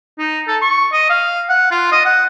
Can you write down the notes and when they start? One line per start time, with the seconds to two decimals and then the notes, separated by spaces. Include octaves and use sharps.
0.18 D#4
0.48 A4
0.62 C#6
0.93 D#5
1.10 F5
1.49 F#5
1.71 F4
1.92 D#5
2.05 F#5